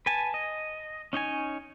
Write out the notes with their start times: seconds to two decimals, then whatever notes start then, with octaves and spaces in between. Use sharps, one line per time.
0.06 B4 G#5 A5
0.34 D#5
1.13 C#4 D#4 C#5 G#5